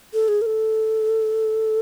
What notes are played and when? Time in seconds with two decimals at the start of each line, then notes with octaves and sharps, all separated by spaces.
0.14 A4
0.28 G#4
0.42 A#4
0.46 A4